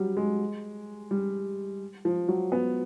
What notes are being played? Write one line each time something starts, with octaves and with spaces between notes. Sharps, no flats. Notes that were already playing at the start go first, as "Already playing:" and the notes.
Already playing: F#3 G3
G#3
G3
F3
F#3
B3